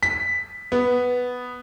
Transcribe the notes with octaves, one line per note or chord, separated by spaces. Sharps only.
B6
B3